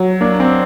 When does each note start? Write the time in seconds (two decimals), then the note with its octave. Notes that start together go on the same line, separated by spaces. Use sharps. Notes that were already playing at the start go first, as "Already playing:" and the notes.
Already playing: F#3
0.21 A#3 D4
0.40 C4